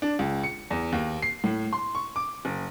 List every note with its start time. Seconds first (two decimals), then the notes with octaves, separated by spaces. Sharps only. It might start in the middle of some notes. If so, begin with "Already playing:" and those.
0.02 D4
0.19 C#2
0.43 C#7
0.70 E2
0.92 D#2
1.22 C7
1.44 A2
1.73 C6
1.95 C#6
2.16 D6
2.45 F#1